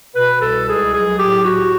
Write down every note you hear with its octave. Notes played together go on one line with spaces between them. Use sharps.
B2 B4
C2 A4
C#2 G#4
F#3 G#4
A2 G4
A2 F#4